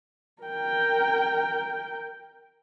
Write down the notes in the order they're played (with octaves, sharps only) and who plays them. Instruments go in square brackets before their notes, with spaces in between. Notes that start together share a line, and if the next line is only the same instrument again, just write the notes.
[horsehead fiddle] A#4 G5